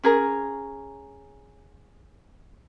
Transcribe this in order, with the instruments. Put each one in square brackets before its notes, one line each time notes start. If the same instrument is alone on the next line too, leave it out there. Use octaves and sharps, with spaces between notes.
[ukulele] C#4 G#4 A#4